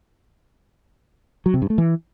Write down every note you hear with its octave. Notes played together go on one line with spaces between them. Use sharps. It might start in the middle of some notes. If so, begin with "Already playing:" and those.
F#3
C3
G2
A3
E3